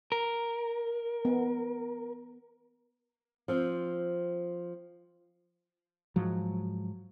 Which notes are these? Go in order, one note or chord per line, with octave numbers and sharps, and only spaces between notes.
A#4
B3
F3 C4
G#2 F3 F#3